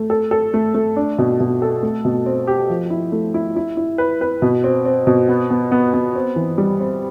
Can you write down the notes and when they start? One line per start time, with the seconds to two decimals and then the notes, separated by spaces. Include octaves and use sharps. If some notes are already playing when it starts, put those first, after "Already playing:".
Already playing: A3
0.10 A4
0.31 A4
0.54 A3
0.74 A3
0.96 D4
1.18 B2
1.40 B2
1.62 A4
1.83 A3
2.05 B2
2.26 C4
2.47 G4
2.70 F3
2.90 E4
3.12 A3
3.34 E4
3.56 E4
3.77 E4
3.98 B4
4.21 B4
4.42 B2
4.64 C4
4.85 C4
5.07 B2
5.28 B3
5.50 B3
5.71 B3
5.94 B3
6.15 C4
6.36 E3
6.58 G3
6.80 C4